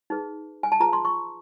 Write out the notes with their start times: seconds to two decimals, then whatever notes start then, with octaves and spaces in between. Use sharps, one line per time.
0.10 D#4 G#4 B4
0.63 G#5
0.72 A5
0.80 F4 G#4 B4 A#5
0.93 C6
1.05 C#6